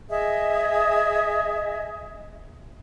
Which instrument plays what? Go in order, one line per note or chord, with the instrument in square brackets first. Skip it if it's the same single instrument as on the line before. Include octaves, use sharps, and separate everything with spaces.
[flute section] G#4 D#5 E5